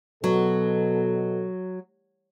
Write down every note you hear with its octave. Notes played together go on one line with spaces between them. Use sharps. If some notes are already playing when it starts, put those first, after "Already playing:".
B2 F#3 A4